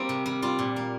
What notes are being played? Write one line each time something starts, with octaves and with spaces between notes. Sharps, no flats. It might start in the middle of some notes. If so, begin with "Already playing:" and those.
Already playing: G3 A#3 C4
C3
G3
G3 F4
A#2
A#3